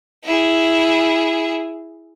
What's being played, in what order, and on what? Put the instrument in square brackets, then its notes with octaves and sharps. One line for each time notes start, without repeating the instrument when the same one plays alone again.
[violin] E4 G#4